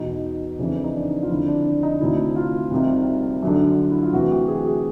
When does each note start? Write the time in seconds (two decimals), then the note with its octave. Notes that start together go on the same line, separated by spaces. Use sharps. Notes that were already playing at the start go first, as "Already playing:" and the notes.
Already playing: E2 B2 D#4
0.59 F2 C#3 E3 D4
0.84 D#4
0.95 D4
1.23 F4
1.29 F2 D3 E4
1.48 D4
1.65 D4
1.83 D#4
2.01 D2 C3 D#3 E4
2.36 F4
2.71 C2 C3 D#3
3.43 F#2 D3
3.91 E4
4.03 F4
4.13 D2 C3 E3 F#4
4.31 G4
4.48 G#4
4.66 G#4